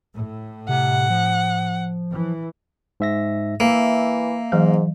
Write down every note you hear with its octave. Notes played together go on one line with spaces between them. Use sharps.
A2
C3 F#5
F3
E3
G#2 E5 A#6
E3 A#3 E5
G#2 E3 F#3